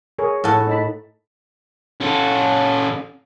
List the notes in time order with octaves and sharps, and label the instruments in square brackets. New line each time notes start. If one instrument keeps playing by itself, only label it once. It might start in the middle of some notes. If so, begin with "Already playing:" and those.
[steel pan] G#4 A#4 C#5
[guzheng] A2 A4 [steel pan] F5 F#5
[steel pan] D#4 A5 B5
[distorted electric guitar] C#4 A4